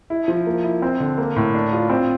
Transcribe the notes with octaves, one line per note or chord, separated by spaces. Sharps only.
E4
F3
A#3
E4
C4
D3
A#3
A2
D4
F4
C4